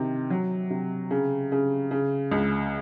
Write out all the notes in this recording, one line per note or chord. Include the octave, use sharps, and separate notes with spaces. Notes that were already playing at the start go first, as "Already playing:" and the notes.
Already playing: C3 D#3
F#3
C3
C#3
C#3
C#3
C#2